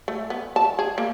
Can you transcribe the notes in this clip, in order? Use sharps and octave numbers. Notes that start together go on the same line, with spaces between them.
A3
B3
A5
G#4
A#3